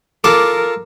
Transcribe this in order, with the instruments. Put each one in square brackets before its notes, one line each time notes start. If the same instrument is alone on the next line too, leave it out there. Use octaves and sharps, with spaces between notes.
[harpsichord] F4 A4 [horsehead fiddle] A#4 [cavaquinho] D6